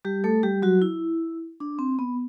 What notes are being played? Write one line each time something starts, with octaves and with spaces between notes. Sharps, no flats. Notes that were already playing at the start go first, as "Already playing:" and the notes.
G3 G4
A3 A4
G3 G4
F#3 F#4
E4
D4
C4
B3